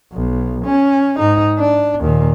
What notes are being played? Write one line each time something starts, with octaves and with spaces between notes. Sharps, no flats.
B1
C#4
G#2 D#4
D4
D#2 A#2